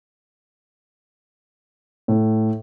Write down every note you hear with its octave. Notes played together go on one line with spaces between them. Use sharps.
A2